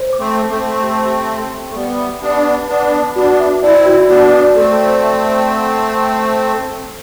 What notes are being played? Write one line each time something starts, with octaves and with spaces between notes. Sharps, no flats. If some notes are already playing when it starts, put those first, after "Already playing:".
Already playing: C5
D6
A3 C4
D6
A3 C4
C5
G4
G4
C6
G5
A3
G3 B3 G4
E5
B3 D4 G4
B4
B3 D4 B4
A5
B3 D4 F#4
E5
C4 E4 D5
F#4
B3 D4 F#4
D5
A3 C4 A4
C5
E5
A4
F#5
C5
C6
C6
D6